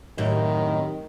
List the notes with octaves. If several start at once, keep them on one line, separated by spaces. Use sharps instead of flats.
F#2 A2 C3 D#3